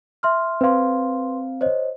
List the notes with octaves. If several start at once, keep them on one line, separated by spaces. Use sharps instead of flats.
E5 C6 F6
C4 B4 F5 C6
C5 C#5 D#5